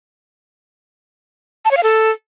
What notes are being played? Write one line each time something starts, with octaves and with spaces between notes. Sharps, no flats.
A5
C#5
F5
A4